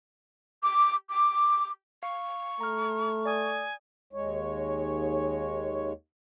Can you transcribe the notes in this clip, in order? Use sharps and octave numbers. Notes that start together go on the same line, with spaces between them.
D6
D6
F5 C#6
A3 A#5 F6
D5 G#5 D#6
D#2 G#3 C#5